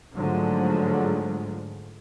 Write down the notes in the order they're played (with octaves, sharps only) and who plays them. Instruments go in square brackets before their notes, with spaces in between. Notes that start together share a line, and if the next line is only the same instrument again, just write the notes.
[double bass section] G#2 D3 F3 F#3 G#3 A3